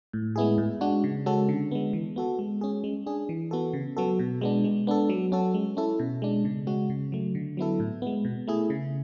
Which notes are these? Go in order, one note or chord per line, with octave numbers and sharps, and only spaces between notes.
A2
G#3 B3 E4 G#4
A2
G#3 D4 F#4
C#3
G#3 C#4 F#4 A4
D3
G#3 B3
E3
B3 F#4 A4
G#3
C#4 G#4
G#3
D4 G#4
E3
B3 F#4 A4
C#3
F#3 B3 F#4 A4
B2
G#3 B3 D4
G#3
B3 D4 A4
F#3
C#4 F#4 A4
G#3
C#4 E4 A4
B2
G#3 D4
C#3
G#3 C#4 F#4
C#3
F#3 A3
D3
F#3 B3 E4 A4
A2
G#3 B3
B2
A3 E4 G#4
C#3